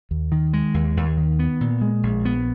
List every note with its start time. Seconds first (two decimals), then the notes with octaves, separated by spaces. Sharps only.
0.11 D#2
0.32 D#3
0.53 G#3
0.74 D#2
0.97 D#2
1.17 D#3
1.39 B3
1.61 A#2
1.81 G#3
2.03 A#1
2.25 B3